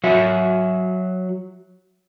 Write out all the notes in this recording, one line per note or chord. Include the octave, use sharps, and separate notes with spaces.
F#3 F#4 E5